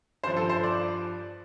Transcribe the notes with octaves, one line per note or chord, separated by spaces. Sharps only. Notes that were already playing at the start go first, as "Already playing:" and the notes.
G2 F3 C5
A4
C5
D5